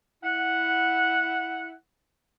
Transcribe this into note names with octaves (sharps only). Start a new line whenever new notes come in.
E4 F#5